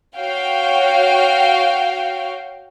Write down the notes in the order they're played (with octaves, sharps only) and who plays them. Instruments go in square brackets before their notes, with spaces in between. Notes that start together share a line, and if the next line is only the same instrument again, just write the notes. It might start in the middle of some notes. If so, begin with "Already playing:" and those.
[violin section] F#4 C#5 F5 G5